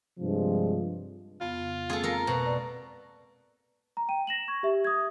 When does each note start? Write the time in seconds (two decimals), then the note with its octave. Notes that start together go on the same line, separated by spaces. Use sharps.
0.19 G2 C3 F3 G#3
1.41 F2 C#3 B3 F4
1.90 G#3 A#3 C4 G#4 A4
2.03 A4 A#4
2.27 B2
2.45 B4 D5 A#5
3.97 A#5
4.09 G5 D#7
4.27 A#6 E7 F#7
4.48 C#6 G#6
4.63 G4 E5
4.85 D#6 G#6